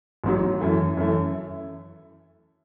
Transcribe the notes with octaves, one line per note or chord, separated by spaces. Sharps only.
A1 G#2 F#3
F#2 E3 A3
F#2 E3 A3